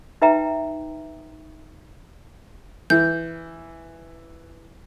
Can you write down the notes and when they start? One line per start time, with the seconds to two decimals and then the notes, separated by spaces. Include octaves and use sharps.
0.22 D#4 B4 E5 G5 A#5
2.90 E3 G6